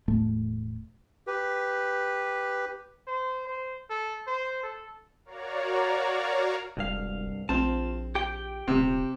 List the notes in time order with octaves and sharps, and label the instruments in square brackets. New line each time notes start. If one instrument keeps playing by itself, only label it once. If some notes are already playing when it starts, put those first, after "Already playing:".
[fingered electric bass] E1 A2 A3
[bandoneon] G4 B4
[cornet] C5
C5
A4
C5
A4
[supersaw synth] F#4 A#4 C#5 D5 F5 A#5
[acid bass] E1 [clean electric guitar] C2 G2 F5
[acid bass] A#1 [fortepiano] C4 [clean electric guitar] F4 A5
[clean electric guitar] G4 G5
[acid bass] D#1 [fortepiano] C3